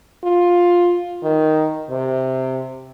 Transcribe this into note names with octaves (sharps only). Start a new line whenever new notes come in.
F4
D#3
C3